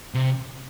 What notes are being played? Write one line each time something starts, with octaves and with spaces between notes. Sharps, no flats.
C3